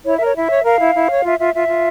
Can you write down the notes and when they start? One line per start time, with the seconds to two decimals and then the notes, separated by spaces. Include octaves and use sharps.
0.05 E4 C#5
0.15 E5
0.21 A#4 C#5
0.35 E4 E5
0.50 C#5
0.65 A#4 F5
0.80 E4
0.95 E4
1.10 C#5
1.24 F4 E5
1.39 F4 E5
1.54 F4 E5
1.69 F4